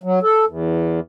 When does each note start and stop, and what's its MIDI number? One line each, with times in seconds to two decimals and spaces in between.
0.03 0.19 54
0.23 0.45 69
0.47 1.00 40